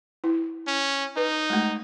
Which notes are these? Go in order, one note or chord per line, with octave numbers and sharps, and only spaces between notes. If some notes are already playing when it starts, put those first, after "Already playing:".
E4
C#4
D#4 B4
G#3 A3